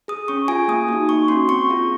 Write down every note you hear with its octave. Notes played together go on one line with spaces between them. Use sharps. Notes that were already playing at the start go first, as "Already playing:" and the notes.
G#4 D#6
C#4 C#6
F4 G#4 G#5
A#3 D#6
D#4 F#4
A#3 C#6
C#4 F#4 C6
C4 C#6
F4 G#4